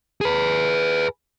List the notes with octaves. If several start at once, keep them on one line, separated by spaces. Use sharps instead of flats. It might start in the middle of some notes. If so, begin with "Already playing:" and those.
G#4 B4